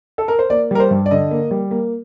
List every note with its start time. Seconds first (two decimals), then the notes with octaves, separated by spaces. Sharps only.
0.18 A4
0.28 A#4
0.39 C5
0.50 A#3 D5
0.71 G3 A#4
0.80 C5
0.90 G2
1.06 D5
1.11 D3 D#5
1.31 A#3
1.51 G3
1.71 A#3